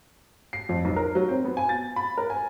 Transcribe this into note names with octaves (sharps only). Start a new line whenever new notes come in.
C7
F2
B1
A#4
F#3
C4
B3
G#5
A6
B5
A#4
G#5